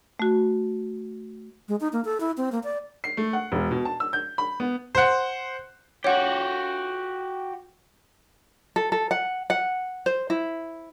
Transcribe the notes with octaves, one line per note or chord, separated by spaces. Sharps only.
A3 F#4
G#3
D#4
A#3
A4
E4
C4
A#3
D5
C7
A3
F#5
E1
B2
A5
E6
G6
B5
B3
C5 F#5
F#4 G4 C#5 F#5
A4
A4
F#5
F#5
C5
E4